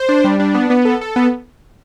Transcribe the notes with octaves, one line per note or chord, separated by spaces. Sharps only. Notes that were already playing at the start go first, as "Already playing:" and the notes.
Already playing: C5
D4
G3
D4
B3
B3
A4
A4
B3